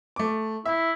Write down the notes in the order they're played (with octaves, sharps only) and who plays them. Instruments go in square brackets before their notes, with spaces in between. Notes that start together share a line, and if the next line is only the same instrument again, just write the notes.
[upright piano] A3 D6
[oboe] E4 [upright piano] E5